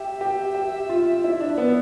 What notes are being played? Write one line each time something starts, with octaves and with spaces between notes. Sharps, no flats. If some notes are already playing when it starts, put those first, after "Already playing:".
Already playing: G4 E5
G4
G4
F4
E4
D4
B3